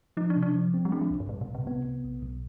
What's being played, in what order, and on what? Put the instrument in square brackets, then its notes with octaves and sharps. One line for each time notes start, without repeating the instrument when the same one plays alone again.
[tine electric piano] F3 [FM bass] D#4
[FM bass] D4
[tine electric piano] C3
[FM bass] D4
[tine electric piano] F3
C4
[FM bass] G3
[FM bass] G#3 [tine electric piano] D4
[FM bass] F3
[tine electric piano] C2
[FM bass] G2
[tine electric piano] C2 [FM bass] G#2
[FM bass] B2
[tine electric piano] C2
[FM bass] C3
[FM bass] C3 [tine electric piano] B3
[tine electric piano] B3
B1
B1